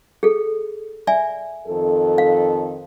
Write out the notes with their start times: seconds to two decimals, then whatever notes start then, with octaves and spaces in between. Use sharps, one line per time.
0.23 G#4 A4
1.07 D5 E5 G#5
1.67 F2 D#3 A4
2.18 F5